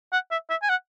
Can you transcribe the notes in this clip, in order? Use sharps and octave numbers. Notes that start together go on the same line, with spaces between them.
F#5
E5
E5
G#5
F#5